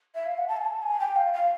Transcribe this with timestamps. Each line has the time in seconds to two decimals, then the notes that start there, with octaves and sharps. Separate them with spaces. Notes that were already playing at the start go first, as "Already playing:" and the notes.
0.15 E5
0.26 F5
0.38 F#5
0.48 A5
0.57 G#5
0.65 A5
0.83 G#5
1.00 G5
1.16 F5
1.33 F5